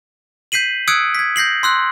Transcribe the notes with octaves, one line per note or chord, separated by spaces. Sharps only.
G6 B6 C7 D#7 F#7
D#6 E6 F#6 G#6 C#7 D7
G#6 B6
G6 A#6 C7 F#7
C6 E6 F#6